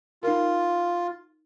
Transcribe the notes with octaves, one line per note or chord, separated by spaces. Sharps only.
D#4 F4 A#4